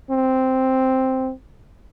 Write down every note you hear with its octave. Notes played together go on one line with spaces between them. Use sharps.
C4